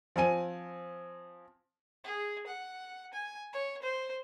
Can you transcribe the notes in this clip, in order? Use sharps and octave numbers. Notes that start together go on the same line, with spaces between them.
F3 C4 G#5 D#7
G#4
F#5
G#5
C#5
C5